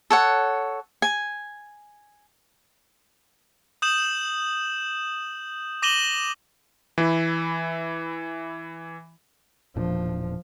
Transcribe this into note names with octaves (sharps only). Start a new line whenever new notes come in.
A4 C#5 F#5
G#5
D#6 G6 E7 F#7
D6 A#6 D#7 E7 F#7 G7
E3 E4
E1 A#2 F3 D4